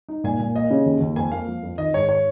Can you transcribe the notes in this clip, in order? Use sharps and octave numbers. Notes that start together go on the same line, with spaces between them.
D#4
A#2 G#5
A#2
A#3 D#5
C#3
D#2
D#2
F2 G#5
A#3 F5
F3
F2
D#3 D#5
G#2 C#5
C#5